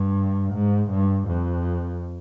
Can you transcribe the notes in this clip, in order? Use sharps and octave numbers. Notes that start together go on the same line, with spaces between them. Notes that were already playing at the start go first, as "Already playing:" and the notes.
Already playing: G2
G#2
G2
F2